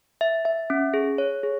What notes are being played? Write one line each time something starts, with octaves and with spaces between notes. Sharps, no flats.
E5
E5
C#4
G#4
C#5
G#4